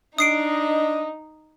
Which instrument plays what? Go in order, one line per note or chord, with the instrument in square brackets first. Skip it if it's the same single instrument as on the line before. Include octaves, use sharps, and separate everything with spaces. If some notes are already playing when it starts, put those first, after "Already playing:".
[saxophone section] D4 [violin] D#4 [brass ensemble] D#5 [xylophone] D#6 C7 D7